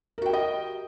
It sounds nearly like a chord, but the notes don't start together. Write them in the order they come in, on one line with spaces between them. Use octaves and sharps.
A#4 F#4 G5 G4 D#5